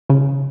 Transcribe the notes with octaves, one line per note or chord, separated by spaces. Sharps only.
C#3